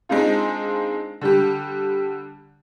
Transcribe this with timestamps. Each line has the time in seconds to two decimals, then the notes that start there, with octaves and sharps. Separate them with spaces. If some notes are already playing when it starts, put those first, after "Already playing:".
0.09 G#3 C4 D4 D#4 F4
1.21 D3 G3 G4